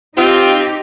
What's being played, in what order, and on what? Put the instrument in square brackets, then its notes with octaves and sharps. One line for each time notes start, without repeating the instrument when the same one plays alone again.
[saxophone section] C4 F4 [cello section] D#4 G4